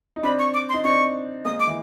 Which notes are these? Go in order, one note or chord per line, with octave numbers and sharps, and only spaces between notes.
D#4
C4 D4 B5
C#6
D6
C6
D#4
C4 D4 C#6
G#3 A#3 D#6
D6
E3